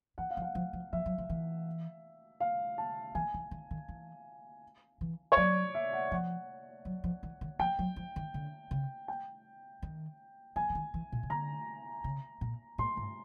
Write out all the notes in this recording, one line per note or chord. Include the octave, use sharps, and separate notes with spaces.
E3 F#5
F5
F3
F#5
F3
F3
F3 E5
F#3
F3
E3
F5
A5
E3 G#5
E3
D#3
D#3
E3
E3
C#5
F#3 D5
E5
F#5
F3 F#5
F#3
F3
E3
D#3
F3 G5
F#3
F3
D#3
D3
C#3
G5
D#3
E3 G#5
E3
D#3
E3
A#2
C#3
D3 A#5
C#3
A#2
A2 C6
G#2